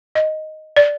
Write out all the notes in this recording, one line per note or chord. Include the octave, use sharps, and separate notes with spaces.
D#5
D5